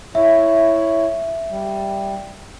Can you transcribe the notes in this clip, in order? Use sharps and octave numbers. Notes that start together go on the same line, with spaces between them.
E4 C#5 E5
G3